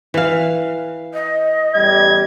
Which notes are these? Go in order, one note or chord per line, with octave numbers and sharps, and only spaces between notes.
E3 F5
D#5
A1 E2 G3 G#6